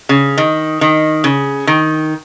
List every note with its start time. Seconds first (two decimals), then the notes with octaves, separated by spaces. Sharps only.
0.09 C#3
0.38 D#3
0.81 D#3
1.24 C#3
1.67 D#3